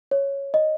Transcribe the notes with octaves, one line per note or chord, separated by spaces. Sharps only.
C#5
D#5